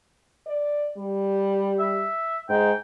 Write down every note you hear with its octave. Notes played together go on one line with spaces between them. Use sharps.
D5
G3
E5
G#2 G5